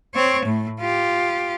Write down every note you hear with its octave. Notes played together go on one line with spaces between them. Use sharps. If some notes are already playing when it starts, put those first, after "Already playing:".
C4 C#5
A2
F4 G4